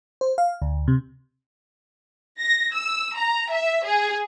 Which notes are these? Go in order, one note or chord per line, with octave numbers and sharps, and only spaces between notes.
C5
F5
D2
C3
A#6
E6
A#5
E5
G#4